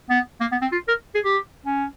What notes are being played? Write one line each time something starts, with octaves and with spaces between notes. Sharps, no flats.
B3
A#3
B3
C4
F4
A#4
G#4
G4
C#4